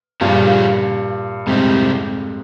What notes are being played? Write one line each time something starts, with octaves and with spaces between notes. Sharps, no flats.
G2 A#2 C#3 F3 A#3
F2 G#2 C3 G3 C4 D#4